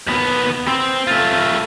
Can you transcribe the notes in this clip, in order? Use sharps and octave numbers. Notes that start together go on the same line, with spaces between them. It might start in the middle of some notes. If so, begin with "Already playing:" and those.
D#2 B3
C4
A3 F4